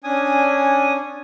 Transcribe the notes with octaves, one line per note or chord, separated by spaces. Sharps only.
C#4 D4 G#5 D#6